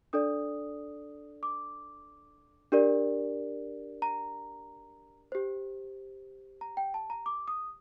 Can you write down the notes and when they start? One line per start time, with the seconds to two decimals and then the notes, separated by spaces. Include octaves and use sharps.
0.13 D4 A4 D5 D#6
1.43 D6
2.72 D4 G4 A#4 D5
4.02 A#5
5.32 G4 C5
6.61 A#5
6.77 G5
6.94 A5
7.10 A#5
7.26 D6
7.48 D#6